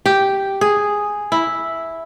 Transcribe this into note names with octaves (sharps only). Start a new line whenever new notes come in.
G4
G#4
E4